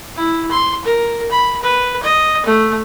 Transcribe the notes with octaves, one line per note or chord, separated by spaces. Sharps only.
E4
C6
A#4
B5
B4
D#5
A3